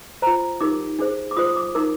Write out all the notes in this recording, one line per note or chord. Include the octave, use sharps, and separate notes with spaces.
F4 C5 A#5
D#4 G4 A#4 D6
D4 G#4 C5
D6
F4 C5 D#6
D#6
D6
D#4 A#4 D6